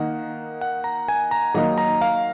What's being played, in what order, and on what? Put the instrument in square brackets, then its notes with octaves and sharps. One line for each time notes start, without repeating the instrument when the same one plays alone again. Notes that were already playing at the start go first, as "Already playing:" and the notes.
Already playing: [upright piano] D#3 A#3 D#4 [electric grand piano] F#5
[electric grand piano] F#5
A#5
G#5
A#5
[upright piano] D#3 F#3 A#3 D#4 F#4 [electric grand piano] A#5
[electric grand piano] A#5
F5